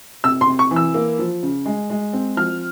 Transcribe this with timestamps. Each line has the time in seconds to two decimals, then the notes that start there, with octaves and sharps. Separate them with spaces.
0.24 C3 E6
0.41 C6
0.47 C3
0.59 C#6
0.71 E3
0.76 E6
0.94 A#3
1.19 F3
1.43 C#3
1.66 G#3
1.90 G#3
2.13 C4
2.37 F3 F6